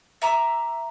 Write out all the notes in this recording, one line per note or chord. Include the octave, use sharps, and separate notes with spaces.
E5 A#5 D6